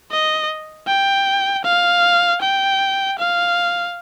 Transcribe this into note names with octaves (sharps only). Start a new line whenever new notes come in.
D#5
G5
F5
G5
F5